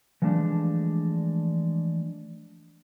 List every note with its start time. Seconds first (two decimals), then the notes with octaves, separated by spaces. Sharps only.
0.22 E3 F3 G#3 A3 D4